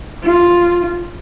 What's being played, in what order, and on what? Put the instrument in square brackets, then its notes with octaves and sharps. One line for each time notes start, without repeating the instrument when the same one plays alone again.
[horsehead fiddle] F4